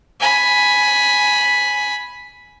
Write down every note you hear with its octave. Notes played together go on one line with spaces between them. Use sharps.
G#5 B5